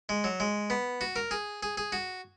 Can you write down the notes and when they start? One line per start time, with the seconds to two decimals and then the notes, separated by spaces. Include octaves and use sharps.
0.09 G#3
0.24 F#3
0.40 G#3
0.70 B3
1.01 F#4
1.16 A#4
1.31 G#4
1.63 G#4
1.77 G#4
1.92 F#4